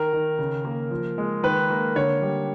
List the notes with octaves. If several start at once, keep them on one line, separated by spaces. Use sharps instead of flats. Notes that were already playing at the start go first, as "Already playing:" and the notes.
Already playing: D#3 A#4
D#3
C#3
A#3
F3
G#3
D#3 B4
A#3
D3 C#5
G3